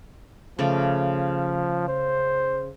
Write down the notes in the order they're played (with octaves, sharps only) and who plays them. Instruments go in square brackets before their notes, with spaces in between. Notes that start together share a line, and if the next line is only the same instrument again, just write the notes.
[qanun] C#3 A3 D5 [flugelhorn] F3
[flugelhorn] C5